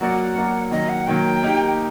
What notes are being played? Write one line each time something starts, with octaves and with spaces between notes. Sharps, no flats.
F#3 A#3 F#4 A#4 D5 F#5
F#3 A#3 F#4 A#4 D5
D#3 F#3 A#3 D#5
F#5
D#3 F#3 A#3 G5
A#3 D#4 G4